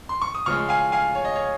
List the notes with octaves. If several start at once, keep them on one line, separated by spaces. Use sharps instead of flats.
C6
C#6
D#6
C#3 F3 G#3 C#6 F6
F5 G#5
F5 G#5
C#5
D#5
C#5